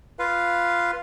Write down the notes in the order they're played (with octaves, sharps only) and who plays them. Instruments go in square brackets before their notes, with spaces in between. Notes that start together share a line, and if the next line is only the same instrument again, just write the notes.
[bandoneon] F4 B4 F5